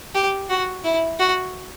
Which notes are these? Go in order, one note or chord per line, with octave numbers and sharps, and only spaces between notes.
G4
F#4
E4
F#4